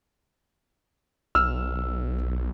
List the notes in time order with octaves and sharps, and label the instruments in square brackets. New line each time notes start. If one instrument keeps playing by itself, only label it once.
[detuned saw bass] B1 [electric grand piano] E6 F6